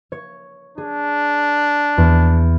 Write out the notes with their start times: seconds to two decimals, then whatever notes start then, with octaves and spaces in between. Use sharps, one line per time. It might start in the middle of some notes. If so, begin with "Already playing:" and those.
0.12 C#5
0.78 D4 G#4
1.98 E2